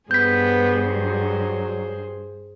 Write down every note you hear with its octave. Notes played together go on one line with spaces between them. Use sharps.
G2 B3 G#4 C5 G6 B6
F#3